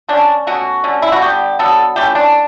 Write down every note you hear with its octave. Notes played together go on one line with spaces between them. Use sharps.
D3 A3 C#4 D4
B2 A3 C#4 F#4
D3 A3 C#4
E4
F#4
D3 G3 B3 G4
D3 F#3 B3 A4
E3 A3 C#4 G4
D4